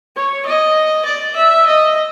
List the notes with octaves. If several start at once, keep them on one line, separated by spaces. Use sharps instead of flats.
C#5
D#5
D5
E5
D#5